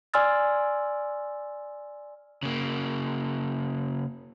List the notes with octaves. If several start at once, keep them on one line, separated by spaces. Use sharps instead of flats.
D5 G#5 C6 E6 F6 A6
C#3 A#3